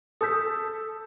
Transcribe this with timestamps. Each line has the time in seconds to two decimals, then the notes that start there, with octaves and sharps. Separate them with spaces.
0.21 A4 D#6 E6 G6 B6